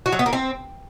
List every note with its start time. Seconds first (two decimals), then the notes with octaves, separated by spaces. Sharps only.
0.06 F#4
0.12 F#3
0.19 B3
0.26 A#3
0.33 C4